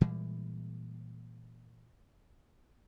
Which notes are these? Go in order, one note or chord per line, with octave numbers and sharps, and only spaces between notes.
A#2 E3 G3 G#3